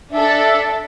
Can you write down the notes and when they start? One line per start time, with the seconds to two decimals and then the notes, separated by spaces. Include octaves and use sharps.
0.12 D4 A4 E5